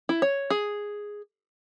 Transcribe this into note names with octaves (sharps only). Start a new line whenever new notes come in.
E4
C#5
G#4